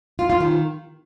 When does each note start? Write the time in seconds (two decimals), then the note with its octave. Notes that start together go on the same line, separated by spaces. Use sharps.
0.19 F4
0.30 F4
0.40 D#3